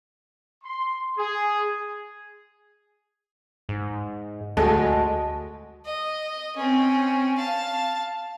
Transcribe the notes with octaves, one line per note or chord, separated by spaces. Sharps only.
C6
G#4
G#2
D2 G#3 A3 F#4 D#5 A5
D#5
C4 C#4
F5 A5